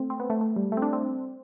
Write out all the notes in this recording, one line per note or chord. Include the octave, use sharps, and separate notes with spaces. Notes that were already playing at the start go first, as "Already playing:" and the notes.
Already playing: A3 C4
C4
B3
A3
A3
G3
A3
C4
D4
C4